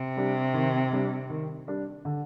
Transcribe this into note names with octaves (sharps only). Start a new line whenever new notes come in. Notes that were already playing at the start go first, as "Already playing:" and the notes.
Already playing: C3
G3 D4
D#3
G3 D4
D#3
G3 D4
D3